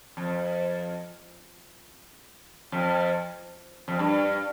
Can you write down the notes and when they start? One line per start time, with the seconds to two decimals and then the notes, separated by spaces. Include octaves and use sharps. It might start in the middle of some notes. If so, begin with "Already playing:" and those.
0.17 F2
2.72 F2
3.88 F2
3.99 G2